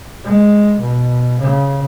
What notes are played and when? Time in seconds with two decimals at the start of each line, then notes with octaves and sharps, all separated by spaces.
0.24 G#3
0.80 B2
1.40 C#3